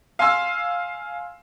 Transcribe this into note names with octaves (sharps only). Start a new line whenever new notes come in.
F5 G#5 C6 E6 C7